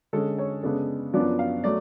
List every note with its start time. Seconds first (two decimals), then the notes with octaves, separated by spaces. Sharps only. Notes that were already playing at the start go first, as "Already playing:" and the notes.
0.13 D3 G#3 C#4 A4
0.38 C#5
0.63 C#3 G#3 B3 D4 A4
1.14 F#2 F3 B3 D4 D5
1.39 F5
1.64 F#3 A3 D5